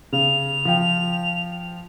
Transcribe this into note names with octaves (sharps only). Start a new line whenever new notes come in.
C#3 F7
F3 G5